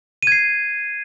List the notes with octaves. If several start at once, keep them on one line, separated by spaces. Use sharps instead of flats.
G#6 C7 D#7